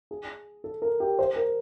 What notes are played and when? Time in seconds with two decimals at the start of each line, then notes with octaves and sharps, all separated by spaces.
0.11 G#4
0.64 A4
0.82 A#4
1.00 G4
1.19 C5
1.36 A#4